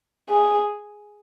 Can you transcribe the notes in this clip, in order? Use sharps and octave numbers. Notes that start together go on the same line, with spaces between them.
G#4